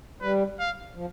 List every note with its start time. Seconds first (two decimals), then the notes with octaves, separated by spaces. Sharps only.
0.21 G3 B4
0.59 F5
0.95 F3